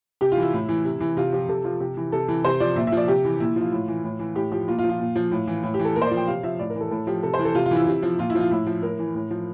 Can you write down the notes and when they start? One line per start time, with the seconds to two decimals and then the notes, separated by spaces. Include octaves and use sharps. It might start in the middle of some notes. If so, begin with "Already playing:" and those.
0.21 C3 G4
0.32 F4
0.37 E3
0.42 E4
0.53 A2
0.69 E3
0.85 C3
1.00 E3
1.17 C3 F4
1.33 F3 G4
1.48 C3 A4
1.64 F3 F4
1.80 C3 G4
1.97 E3
2.12 C3 A4
2.28 E3
2.44 C3 C5
2.60 F3 D5
2.76 A#2 E5
2.87 E5
2.92 F3 D5
3.08 C3 G4
3.24 E3
3.40 A#2 E4
3.56 F3
3.61 F4
3.72 A2
3.88 E3
4.04 A2
4.19 E3
4.36 A2 G4
4.52 F3 G4
4.68 A#2 F4
4.78 F4
4.84 F3
4.89 F4
5.00 A#2
5.16 F3
5.31 A2
5.47 E3
5.63 A2
5.74 G4
5.80 E3
5.85 A4
5.96 A#2 A#4
6.02 C5
6.06 D5
6.11 F3
6.17 G5
6.27 C3 F5
6.43 F3 E5
6.59 A2 D5
6.70 A#4
6.75 E3
6.80 A4
6.91 A2 A4
7.07 F3 G4
7.23 C3 A4
7.34 C5
7.39 E3
7.45 A4
7.55 C3 F4
7.66 F4
7.71 E3
7.76 E4
7.87 C3
8.02 F3
8.19 A#2 F4
8.30 E4
8.35 F3
8.40 F4
8.51 A2 E4
8.67 F3
8.83 A2 A#4
8.99 E3
9.15 A2
9.31 F3